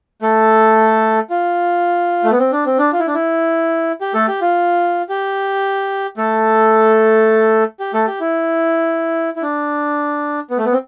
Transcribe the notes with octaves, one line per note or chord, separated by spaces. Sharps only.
A3 A4
F4
A3
B3
C4
D4
C4
D4
F4
E4
D4
E4
G4
A3 A4
G4
F4
G4
A3 A4
G4
A3 A4
G4
E4
E4
D4
B3
A3
B3
C4